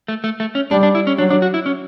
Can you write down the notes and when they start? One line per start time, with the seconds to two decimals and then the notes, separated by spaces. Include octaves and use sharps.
0.08 A3
0.24 A3
0.40 A3
0.55 C#4
0.71 G3 D4
0.83 D4
0.95 E4
1.07 C#4
1.18 F#3 D4
1.31 D4
1.42 F#4
1.54 E4
1.66 C#4